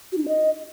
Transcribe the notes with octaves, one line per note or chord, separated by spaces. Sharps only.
F#4
D#4
D4
D#5